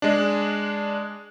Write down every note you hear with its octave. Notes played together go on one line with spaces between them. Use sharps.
G#3 D4